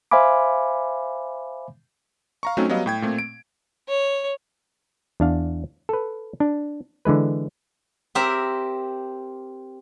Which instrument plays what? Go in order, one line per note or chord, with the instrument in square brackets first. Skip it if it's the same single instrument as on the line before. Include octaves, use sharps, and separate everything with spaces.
[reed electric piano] C5 E5 F5 G#5 B5 D6
[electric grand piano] F5 A#5 C#6
F#3 A3 C4 C#4 D#4 F#4
F#3 G3 B3 D#5 F5
A2 G5 G#6
A#2 A3 C4
D7
[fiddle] C#5
[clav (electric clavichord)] E2 D4 F5
A4 B4
D4
D3 E3 G#3 B4
[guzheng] C4 G4 A#4 E5 A#5